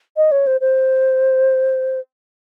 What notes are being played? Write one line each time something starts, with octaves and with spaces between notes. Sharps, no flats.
D#5
C#5
C5
C5